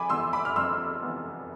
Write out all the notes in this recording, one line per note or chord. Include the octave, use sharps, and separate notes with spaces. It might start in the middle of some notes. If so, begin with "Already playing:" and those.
Already playing: F2 G#5 B5 D6
E3 B3 C6 E6
B5 D6
F6
F2 C6 E6
E3 B3